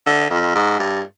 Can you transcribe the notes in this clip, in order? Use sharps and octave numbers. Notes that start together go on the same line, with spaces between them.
D3
F2
G#2
G2